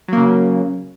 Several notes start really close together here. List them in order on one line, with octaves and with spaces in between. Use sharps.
F#3 A#3 C#3